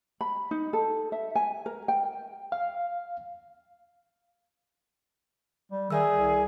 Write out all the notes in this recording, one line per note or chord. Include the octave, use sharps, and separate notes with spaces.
B5
D#4
A4
E5
G#5
A#4
G5
F5
G3
D#3 G#4 D5 E5 E6
C2